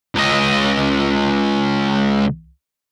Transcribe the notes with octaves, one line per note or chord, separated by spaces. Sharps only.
C#2 D#5